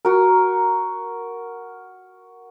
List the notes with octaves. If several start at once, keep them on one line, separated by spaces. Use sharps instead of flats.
F#4 A#4